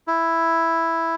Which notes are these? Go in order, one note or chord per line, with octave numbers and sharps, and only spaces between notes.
E4